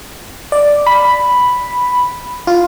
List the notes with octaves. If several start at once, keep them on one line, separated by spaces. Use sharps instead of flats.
D5
B5
F4